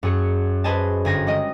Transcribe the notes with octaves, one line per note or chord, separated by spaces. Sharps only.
F#2 G#4 C#7
G#4 B4 C5 D#5 G#5 A5
G1 G#5 A#6
G3 G#3 D#5